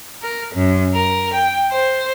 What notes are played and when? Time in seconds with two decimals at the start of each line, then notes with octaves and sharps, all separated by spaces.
0.22 A#4
0.54 F#2
0.93 A#4
1.32 G5
1.71 C5